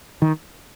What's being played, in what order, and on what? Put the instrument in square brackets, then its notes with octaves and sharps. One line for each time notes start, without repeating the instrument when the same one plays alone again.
[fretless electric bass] D#3